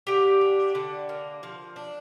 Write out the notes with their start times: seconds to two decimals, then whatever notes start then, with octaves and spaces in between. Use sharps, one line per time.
0.07 D3 G4 G5
0.41 D4
0.75 D3
1.09 A#3
1.43 F3
1.76 D4